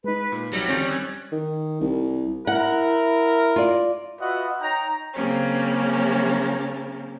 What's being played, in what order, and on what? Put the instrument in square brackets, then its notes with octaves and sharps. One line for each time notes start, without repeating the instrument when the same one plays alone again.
[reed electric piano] G#3 D#4 [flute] B4
[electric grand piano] A#2
[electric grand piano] C2 F2 F#3 [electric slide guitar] G3 [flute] A#6
[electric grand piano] D3 D#3 F3 [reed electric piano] C4 G6 A6 [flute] C#4
[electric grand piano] E6 F#6 G#6
[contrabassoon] D#3
C2
[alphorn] E4 [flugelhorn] A#4 [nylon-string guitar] F#5
[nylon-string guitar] F4 D5
[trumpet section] F4 F#4 B4 D#5 E5 F#5
D#4 C#5 G5 A#5
[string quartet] C#3 F#3 A#3 C4 C#4